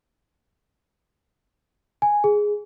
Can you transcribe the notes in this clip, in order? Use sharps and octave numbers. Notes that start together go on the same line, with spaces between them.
G#5
G#4